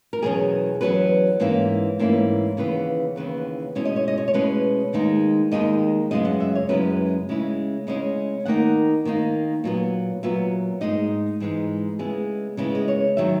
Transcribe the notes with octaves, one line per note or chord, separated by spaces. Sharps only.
A#4
E2 B2 F#3 C#4 G#4
E2 B2 F#3 C#4 B4
G#2 E3 A#3 C#4 E4
G#2 E3 A#3 C#4 E4
D#2 C#3 E3 B3 B4
D#2 C#3 E3 B3 B4
B2 G#3 C#4 E4 C#5
D#5
C#5
D#5
C#5
C#5
B2 G#3 C#4 E4 B4
D#2 D#3 G#3 D#4
D#2 D#3 G#3 D#4 D#5
F#2 C#3 G#3 B3 E4 D#5
F#5
E5
C#5
F#2 C#3 G#3 B3 E4 B4
C#3 G#3 C#4 E4
C#3 G#3 C#4 E4 D#5
D#3 A#3 D#4 F#5
D#3 A#3 D#4
A#2 F#3 B3
A#2 F#3 B3 E5
G#2 E3 G#3 D#4 D#5
G#2 E3 G#3 D#4
C#3 G#3 B3 E4 G#4
C#3 G#3 B3 E4 G#4
D#5
C#5
D#3 F#3 E5